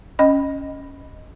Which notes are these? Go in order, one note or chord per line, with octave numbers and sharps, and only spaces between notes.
C#4 D#5 B5